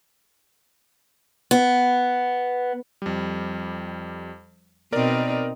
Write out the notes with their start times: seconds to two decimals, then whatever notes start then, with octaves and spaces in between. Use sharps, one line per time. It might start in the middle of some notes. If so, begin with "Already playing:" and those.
1.51 B3
3.02 F2 G3
4.93 B2 C4 D#4 A#4 D5